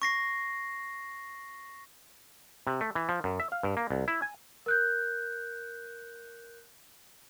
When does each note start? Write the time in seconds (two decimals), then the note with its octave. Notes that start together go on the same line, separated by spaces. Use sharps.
0.02 C#6 A#6 C7
2.67 C3
2.81 A3
2.95 E3
3.09 F3
3.24 F#2
3.40 E5
3.52 F5
3.63 G2
3.77 A#3
3.90 C2
4.08 E4
4.22 G#5
4.66 A#4 F#6 G6